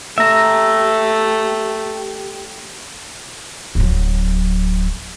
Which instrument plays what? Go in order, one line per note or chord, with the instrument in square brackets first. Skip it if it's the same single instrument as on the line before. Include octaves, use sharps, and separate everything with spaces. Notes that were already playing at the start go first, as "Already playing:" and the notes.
[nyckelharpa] A3 [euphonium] G4 [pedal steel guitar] E5 A#5
[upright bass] D1 F#3